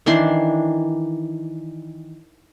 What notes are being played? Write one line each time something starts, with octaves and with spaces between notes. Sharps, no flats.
D#3 E3 D4 C6